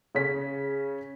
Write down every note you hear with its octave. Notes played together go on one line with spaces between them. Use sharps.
C#3 C#4 B6